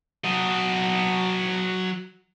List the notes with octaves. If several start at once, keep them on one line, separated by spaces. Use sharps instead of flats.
F#3 D#5